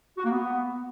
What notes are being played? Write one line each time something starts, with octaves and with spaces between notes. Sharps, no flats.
F#4
A#3
B3